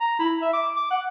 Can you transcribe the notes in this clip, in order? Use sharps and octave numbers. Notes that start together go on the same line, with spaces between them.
A#5
E4
E5
D6
D6
F#5